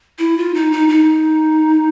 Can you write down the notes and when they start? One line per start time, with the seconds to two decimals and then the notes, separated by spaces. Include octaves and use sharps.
0.19 E4
0.37 F4
0.54 D#4
0.72 D#4
0.89 D#4